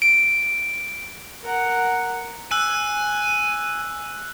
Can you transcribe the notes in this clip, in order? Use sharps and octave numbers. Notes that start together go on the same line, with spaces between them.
D7
A#4 F#5
G#5 E6 F#6